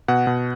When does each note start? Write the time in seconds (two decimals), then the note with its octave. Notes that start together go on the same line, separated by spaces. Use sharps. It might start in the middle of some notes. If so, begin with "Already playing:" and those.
0.08 B2 F#5
0.27 B2